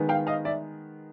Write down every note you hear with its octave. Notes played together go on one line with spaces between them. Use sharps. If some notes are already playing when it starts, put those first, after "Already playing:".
Already playing: D#3 G#3 B3
F5 G5
D#5 F5
D5 E5